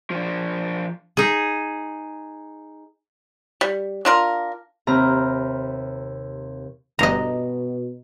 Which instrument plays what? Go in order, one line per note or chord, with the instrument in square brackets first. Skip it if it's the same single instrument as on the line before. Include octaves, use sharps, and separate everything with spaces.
[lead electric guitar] F3 D4
[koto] D#4 G#4
[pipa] G3
D4 F4 A#4
[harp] D#2 C3 A#5 B5 F6
[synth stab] G1 G2 [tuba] B2 [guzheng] D#5 A#5